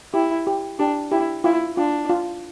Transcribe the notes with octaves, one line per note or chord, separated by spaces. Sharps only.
E4 G4
G4
D4 G4
E4 G4
E4 F4
D4 F4
F4